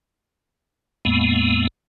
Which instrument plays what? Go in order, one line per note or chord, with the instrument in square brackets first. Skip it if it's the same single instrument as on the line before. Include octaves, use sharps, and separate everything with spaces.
[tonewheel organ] E2 A2 G#3 A#3 B3